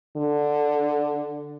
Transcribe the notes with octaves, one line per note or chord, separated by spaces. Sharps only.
D3